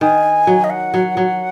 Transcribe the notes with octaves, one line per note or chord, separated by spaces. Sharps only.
D#3 G#5
F#3
D#5
F#5
F#3
F#3